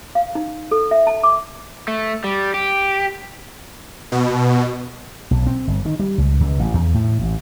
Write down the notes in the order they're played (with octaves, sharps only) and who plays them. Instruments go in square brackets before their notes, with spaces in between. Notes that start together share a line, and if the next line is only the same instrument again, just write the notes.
[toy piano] F5
D#4
A4
E5
A5
D6
[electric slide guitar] A3
G3
G4
[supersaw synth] B2
[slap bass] B1
C4
G1
D#3
G3
C#2
C#2
A1
E2
A2
A1